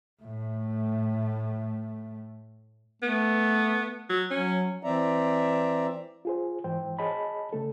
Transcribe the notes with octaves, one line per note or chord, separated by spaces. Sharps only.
A2 A3
A3 B3
F#3
F#3 C#4
E3 C4 D5 E5 A#5
F4 G#4 C5
G#2 E3 C5 G5
G#4 C#5 D#5 A5 B5
C#3 A3 A4